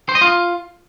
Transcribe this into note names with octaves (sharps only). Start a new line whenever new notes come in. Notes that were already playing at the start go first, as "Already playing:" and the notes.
C5
D#5
F4